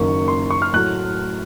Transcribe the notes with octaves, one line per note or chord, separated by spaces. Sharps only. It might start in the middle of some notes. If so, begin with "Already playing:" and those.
Already playing: F#1 F#2 D#3 A#3 C#6
C6
C#6
F6
A2 F#3 A3 F#6